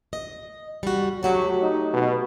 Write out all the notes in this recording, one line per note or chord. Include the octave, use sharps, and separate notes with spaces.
D#5
G3 F#4
F#3 A3 F#4 G4
D#4
B2